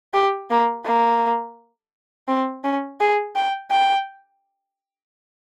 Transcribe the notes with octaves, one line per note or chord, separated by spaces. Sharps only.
G4
A#3
A#3
C4
C#4
G#4
G5
G5